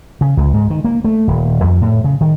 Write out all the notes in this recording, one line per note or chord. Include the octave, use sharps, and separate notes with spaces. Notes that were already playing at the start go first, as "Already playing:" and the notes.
C#3
C#2
G#2
D#3
A#3
A3
D#1
F2
A2
C#3
D#3